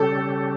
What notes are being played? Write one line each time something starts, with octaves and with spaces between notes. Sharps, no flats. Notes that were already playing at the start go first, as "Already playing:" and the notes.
Already playing: C#3 G3 C#4 G4 A4